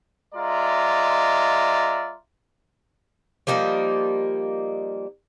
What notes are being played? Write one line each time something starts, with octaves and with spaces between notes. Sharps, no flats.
G#3 F4 D5 E5 A#5
F3 G3 A#3 D#4